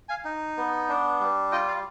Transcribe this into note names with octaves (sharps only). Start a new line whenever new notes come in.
F5 G#5
D#4
B3
D4
G3
F4 D#5 G5
D5 F5